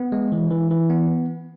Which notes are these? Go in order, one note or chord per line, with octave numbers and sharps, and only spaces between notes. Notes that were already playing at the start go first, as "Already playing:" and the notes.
Already playing: B3
G#3
E3
E3
E3
B3